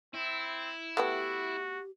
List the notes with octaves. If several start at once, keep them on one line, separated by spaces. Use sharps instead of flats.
C4 E4
A3 B3 F#4 G4 G5